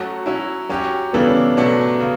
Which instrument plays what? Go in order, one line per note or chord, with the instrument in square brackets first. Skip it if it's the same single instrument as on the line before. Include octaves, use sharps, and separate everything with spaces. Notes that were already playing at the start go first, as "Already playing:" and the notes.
Already playing: [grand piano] F#3 A3 C#4 F#4
F#3 C#4 E4
F#3 C#4 G4
[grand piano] C#3 E3 G3 D4 A4 [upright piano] B3
[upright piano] C#4
[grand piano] B2 F#3 A3 D4
C#3